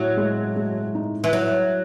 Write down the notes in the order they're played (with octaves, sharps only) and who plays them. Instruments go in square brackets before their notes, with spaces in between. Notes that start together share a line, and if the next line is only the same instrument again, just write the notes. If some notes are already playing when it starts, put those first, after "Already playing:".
Already playing: [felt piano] A2 [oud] F#3
[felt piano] G#3
G#3
D#4
[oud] E3
[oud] F#3 [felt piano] E4